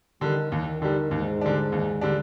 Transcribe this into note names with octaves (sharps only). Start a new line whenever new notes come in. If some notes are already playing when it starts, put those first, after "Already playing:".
D3 D#3 G3
D#2 D#3
D3 D#3 G3
D#2 G#2
D3 G3 D4
D#2
D3 G3 D4